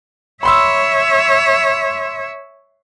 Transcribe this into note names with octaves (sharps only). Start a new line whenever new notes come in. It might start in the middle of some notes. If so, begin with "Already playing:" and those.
C#5 E5 B5 C6 E6